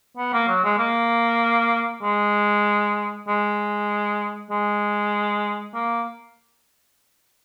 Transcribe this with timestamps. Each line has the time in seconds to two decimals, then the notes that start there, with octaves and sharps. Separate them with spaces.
0.17 B3
0.33 A#3
0.48 F#3
0.64 G#3
0.79 A#3
2.03 G#3
3.28 G#3
4.51 G#3
5.75 A#3